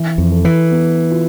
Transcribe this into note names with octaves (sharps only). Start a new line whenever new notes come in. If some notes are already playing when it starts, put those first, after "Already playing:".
Already playing: E3
F2
A4
E3
B3
F4